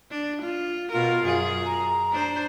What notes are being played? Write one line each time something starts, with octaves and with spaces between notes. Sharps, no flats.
D4
F4
B2 F4 A#4
F#2 G#4
A#5
D4 C5